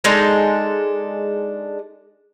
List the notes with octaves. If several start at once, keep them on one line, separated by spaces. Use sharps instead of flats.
G#3 D4 D#4 A4